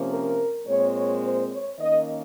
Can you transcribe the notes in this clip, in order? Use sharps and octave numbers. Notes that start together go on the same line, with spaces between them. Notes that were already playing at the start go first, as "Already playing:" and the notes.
Already playing: C3 F3 A#3 C#4
A#4
A#2 G#3 C4 C#5
C#5
C5
C#5
D#3 A#3 C#4 D#5